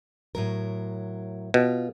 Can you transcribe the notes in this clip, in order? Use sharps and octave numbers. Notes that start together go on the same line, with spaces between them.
A2 F#3 A#4
B2 F4